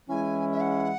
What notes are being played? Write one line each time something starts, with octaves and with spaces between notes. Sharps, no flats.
E3 G#3 C#4 E4 G#5
E5
F#5